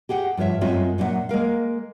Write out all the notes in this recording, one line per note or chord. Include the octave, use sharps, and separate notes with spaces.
G4 G#4 F#5 G5
G2 F3 F4 C#5 E5
F#2 G#3 C4 F4 C#5 E5
A#2 F#3 D4 E4 E5 F#5
G#3 A#3 A#4 F5